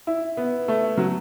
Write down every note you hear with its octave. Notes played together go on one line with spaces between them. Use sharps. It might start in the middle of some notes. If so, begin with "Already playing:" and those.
E4
B3
A3
F#3